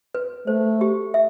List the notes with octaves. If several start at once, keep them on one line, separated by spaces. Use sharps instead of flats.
B4
A3 C5
G4
E5